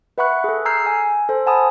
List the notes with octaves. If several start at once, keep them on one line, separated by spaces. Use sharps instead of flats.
B4 E5 F#5 B5 C#6 F#6
G#4 A4
A#5 E6 F6 G6 G#6 C7
G#5
A4 C5
F#5 G#5 A5 B5 D#6